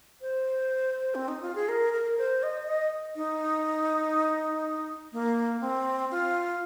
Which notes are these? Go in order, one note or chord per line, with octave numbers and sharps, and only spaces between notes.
C5
C4
D#4
F4
G#4
A#4
A#4
C5
D#5
D#5
D#4
A#3
C4
F4